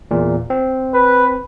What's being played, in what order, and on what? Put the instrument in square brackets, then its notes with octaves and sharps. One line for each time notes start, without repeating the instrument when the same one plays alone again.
[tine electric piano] E2 A#2
C4
[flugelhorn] B4